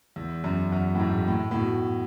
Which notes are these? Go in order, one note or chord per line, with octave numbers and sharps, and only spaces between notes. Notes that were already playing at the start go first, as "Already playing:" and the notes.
E2
F#2
F#2
A2
G#2
A2
A2
B2